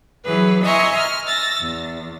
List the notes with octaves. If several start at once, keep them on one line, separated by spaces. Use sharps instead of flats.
E3 F#3 G#4 B4
D#5 E5 G#5 A#5 C6 C#6
F6
E6 A6 A#6
E2